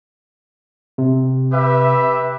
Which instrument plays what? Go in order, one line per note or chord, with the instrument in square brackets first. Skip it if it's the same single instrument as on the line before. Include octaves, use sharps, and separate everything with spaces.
[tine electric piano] C3
[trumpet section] G4 B4 E5